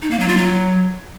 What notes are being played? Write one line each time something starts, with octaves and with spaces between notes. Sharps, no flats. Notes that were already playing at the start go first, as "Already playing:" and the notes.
D#4
A#3
F#3
F4
F#3